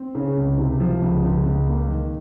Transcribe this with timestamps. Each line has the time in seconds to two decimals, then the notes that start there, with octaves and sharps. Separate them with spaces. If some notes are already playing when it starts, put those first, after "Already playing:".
Already playing: C4
0.15 C#3
0.37 C#2
0.58 C3
0.80 F3
1.02 C#2
1.24 C#2
1.46 C#2
1.66 A#3
1.88 D#3